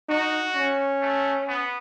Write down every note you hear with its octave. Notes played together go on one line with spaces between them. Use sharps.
D#4 F#4
C#4
A3
B3